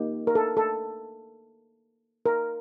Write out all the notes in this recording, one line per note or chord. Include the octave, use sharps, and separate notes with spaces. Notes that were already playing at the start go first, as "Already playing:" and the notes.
Already playing: A#3 D#4 G4
A#4
A4
A4
A#4